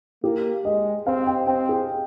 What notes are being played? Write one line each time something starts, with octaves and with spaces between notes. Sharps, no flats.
A#3 G4
G#3 D#5
C4 F5
G5
C4 G5
G#4